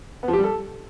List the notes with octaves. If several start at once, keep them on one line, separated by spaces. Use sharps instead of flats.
B3
F3
G4
G3
A4